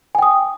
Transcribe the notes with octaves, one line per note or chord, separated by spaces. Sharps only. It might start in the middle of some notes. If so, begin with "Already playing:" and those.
G5 G#5 D#6